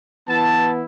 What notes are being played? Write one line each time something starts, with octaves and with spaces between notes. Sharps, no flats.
E3 B3 E4 A5